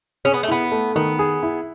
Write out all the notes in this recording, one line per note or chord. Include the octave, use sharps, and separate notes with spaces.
C#4 G#4
B3
A3
B3 E4
A3
D#3 B3
G#4
E4